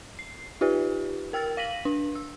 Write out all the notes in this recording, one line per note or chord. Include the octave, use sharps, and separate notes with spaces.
C7
D#4 F4 G4 B4
A#4 G5 E6 F6 A6
F5 A#6 B6 D#7 F#7
D4
E6